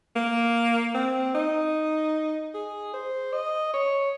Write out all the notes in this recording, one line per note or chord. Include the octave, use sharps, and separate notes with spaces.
A#3
C4
D#4
G#4
C5
D#5
C#5